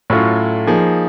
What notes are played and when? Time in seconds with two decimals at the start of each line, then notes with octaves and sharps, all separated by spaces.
0.10 A2 F#3 A3 C#4 F4
0.67 F3 A#3 D#4 G#4